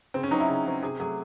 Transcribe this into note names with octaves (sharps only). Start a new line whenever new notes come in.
C#3 C4
C#4
F#3 C4 D#4
E4
C#3
F#3 C4
C3 G#4
F#3 A3 G#4